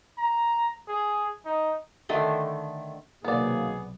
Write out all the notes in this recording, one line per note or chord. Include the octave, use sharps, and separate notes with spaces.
A#5
G#4
D#4
D3 D#3 A3 C6
B1 C3 D#3 F#3 A#3 B3 G#4 D5